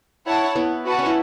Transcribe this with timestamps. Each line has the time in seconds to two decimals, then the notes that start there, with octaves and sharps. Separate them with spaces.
0.25 E4 C#5 F#5 A5
0.56 B3 E4
0.85 F#4 B4 F#5 A5
0.99 C#4
1.06 E4